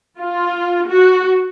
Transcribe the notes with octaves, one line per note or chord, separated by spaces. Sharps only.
F4
F#4